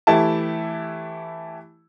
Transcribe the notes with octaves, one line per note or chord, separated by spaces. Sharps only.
E3 A3 E4 G4 A5